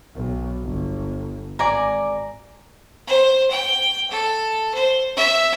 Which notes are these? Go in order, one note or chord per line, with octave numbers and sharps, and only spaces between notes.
B1
G1
G#1 D5 G#5 A#5
C5
G5
A4
C5
E5